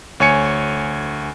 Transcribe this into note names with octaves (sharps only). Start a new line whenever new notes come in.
D2 C#5 G#5 C#7